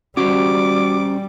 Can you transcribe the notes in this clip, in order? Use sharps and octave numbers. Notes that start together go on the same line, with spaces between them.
G3 C#4 F#4 G4 C5 D6